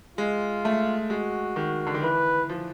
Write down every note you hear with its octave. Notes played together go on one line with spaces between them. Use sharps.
G#3 F4
A3
G#3 F#4
D#3
D3
D#3
E3 B4
F3